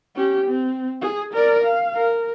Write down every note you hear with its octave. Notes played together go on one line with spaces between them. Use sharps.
C#4 G4
C4
G#4
A#4 D5
F5
A#4